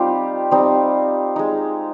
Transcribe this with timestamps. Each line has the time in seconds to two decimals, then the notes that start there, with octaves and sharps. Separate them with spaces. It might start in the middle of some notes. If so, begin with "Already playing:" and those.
Already playing: G3 C4 D#4 F4 G4
0.51 G3 C4 D#4
1.36 G#3 D#4